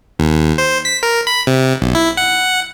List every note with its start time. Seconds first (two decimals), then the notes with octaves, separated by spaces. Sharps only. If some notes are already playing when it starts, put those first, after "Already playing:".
0.19 D#2
0.58 C5
0.85 B6
1.03 A#4
1.27 B5
1.47 C3
1.82 B1
1.95 E4
2.17 F#5